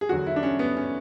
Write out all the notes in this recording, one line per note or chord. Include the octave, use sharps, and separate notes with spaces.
G#4
E2 D3 F#3 F#4
E4
D4
C#4
B3
C#4